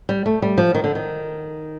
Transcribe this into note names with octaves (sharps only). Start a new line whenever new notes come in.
G3
A3
G3
F3
D#3
D3
D#3